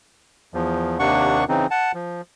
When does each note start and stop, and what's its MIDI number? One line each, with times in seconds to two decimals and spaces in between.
0.54 0.98 40
0.54 0.98 53
0.99 1.44 39
0.99 1.44 48
0.99 1.44 58
0.99 1.44 62
0.99 1.44 78
0.99 1.44 85
1.49 1.66 49
1.49 1.66 52
1.49 1.66 60
1.49 1.66 63
1.71 1.92 78
1.71 1.92 81
1.95 2.21 53